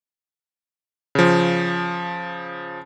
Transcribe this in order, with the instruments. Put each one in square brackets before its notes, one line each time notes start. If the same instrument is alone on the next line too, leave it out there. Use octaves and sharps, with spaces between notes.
[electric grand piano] C#3 F3